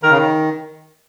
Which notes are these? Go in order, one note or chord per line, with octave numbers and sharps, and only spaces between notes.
D#3 A#4
C#3
D#3